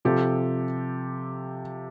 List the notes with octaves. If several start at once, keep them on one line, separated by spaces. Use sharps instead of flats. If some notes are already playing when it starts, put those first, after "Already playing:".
C3 F3 G4 A4